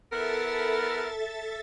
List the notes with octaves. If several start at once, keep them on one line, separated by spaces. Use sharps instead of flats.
B3 E4 A4 A#4 E5 A6